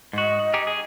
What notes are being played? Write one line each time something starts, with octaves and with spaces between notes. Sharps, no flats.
G#2 F#4 D#5
D#4 G4 G#4
G#4